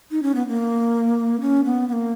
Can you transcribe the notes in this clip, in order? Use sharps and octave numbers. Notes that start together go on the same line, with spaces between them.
D#4
C#4
B3
A#3
C#4
B3
B3
A#3